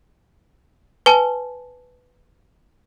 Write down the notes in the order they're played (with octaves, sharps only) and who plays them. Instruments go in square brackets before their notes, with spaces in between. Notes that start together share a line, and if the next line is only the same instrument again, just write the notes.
[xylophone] B4 G#5 A5